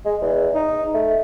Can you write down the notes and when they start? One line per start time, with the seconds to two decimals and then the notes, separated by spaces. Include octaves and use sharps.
0.05 G#3
0.21 E2
0.55 D#4
0.94 A3